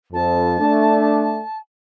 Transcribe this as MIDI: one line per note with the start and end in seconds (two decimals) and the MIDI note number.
0.13 0.58 41
0.13 1.57 81
0.60 1.40 57
0.60 1.40 62